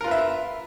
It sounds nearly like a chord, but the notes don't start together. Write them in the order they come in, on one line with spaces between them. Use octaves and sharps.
A#4 F4 B4 E5